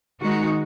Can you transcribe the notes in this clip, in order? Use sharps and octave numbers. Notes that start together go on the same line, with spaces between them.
D#3 G#3 D#4 F#4